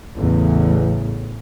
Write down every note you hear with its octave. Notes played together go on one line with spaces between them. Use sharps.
A1 E2 C#3